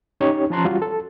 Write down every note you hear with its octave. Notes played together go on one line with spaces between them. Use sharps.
C#4 D#4 G4 C#5
F3 C#4 A5 A#5 C6 F#6
G3 F4 F#4
A4